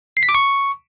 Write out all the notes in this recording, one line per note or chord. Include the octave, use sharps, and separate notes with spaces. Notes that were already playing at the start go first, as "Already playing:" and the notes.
C7
B6
D6
C#6